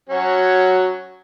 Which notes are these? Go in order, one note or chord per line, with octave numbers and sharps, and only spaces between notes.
F#3 C#4 F#4